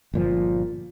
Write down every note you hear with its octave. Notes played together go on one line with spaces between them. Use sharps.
G1 A#2 F3